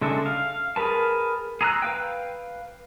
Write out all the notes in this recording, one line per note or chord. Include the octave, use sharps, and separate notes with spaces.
C#3 G#3 D4 A4 E5
F5
G#4 A#4 B4 A5
G#4 A#5 E6 F#6
B4 F5 G5